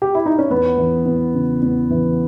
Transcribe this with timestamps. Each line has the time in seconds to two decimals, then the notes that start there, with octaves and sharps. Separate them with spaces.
0.02 G4
0.15 E4
0.26 D#4
0.39 C#4
0.50 E2 B3
0.78 E3
1.05 E2
1.34 C#3
1.62 E2
1.90 E3